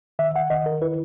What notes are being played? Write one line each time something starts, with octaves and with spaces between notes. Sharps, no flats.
D#3 E5
F#5
D#3 D#5
A#4
E4 B4